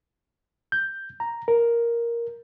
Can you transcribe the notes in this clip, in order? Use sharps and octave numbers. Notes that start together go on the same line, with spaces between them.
G6
A#5
A#4